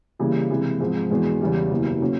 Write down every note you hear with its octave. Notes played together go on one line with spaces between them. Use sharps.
C#3 E3 G3 A#3
C3 E3 G#3
G#2 F3 G#3 C4
E2 B2 G#3
E2 C#3 E3 G3
F#1 E2 B2 G3 A#3
C#3 F#3 A#3 C#4